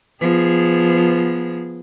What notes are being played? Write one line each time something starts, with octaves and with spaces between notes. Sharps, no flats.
F3 B3 G#4